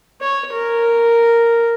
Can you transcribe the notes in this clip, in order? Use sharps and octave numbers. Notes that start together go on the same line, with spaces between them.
C#5
A#4